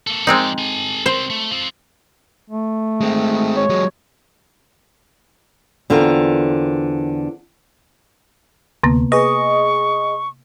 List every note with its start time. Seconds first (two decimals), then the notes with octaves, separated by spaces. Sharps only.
0.07 A#3 A4
0.27 F3 G#3 C4 D#4 D5
0.58 A4 G#5
1.06 G3 C4 C5
1.30 A3
1.51 C4 F4
2.50 A3
3.01 G#3 C4
3.56 C#5
3.69 F#3 G#3
5.90 E2 D3 C4 F4 A#4
8.83 D2 C3 A#3 B3
9.12 G#4 B4 D#5 C#6